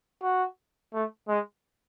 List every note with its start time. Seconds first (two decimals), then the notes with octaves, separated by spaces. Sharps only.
0.22 F#4
0.93 A3
1.28 G#3